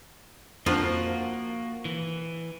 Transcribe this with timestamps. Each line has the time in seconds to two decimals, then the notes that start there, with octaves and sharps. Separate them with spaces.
0.66 F2 F3 A#3 D4 F4 F#4
1.85 E3